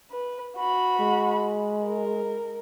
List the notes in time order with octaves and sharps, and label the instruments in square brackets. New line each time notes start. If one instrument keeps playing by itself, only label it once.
[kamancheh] B4
F#4 B5
[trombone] G#3
[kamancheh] A#4